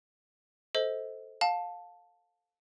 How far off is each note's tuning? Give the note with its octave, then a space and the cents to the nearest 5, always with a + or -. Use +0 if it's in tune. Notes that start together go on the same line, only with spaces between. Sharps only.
A4 +0 C5 +0 D#5 +30
F5 +25 A5 +0